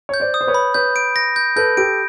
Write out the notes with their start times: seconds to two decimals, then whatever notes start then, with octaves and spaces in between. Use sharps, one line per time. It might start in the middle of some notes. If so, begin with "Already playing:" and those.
0.09 C#5 G6
0.20 C5 D5
0.34 D#6
0.41 C5
0.47 B4 C#5
0.54 B5
0.74 B4 C#5 G6
0.96 D7
1.16 A#6
1.36 G6
1.56 A4 B4 G6
1.77 G4 A4 D7